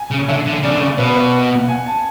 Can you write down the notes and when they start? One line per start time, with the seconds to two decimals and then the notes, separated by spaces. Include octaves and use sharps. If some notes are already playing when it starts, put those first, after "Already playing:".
Already playing: G#5
0.11 C#3
0.28 D3 E5
0.46 D3
0.63 C#3 D5
0.71 D3
0.79 C#3 D5
0.98 B2 B4
1.16 B4
1.63 F#5
1.68 G#5
1.86 A5